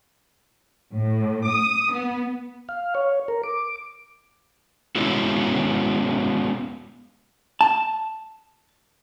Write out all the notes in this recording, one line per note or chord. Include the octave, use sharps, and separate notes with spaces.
A2
D#6
B3
F5
C#5
A#4
D6
G#3 B3 C#4 E4 F#4
A5